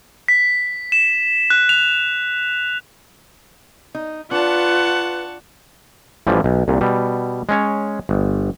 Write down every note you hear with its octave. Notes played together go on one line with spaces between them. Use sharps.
B6
E7
F#6
F7
D#4
D4 F4 B4 F#5 A5 C#6
A1 E3 F3 G3
B1
C2 A#2
B2 G3
G#3 C#4 C#5
G1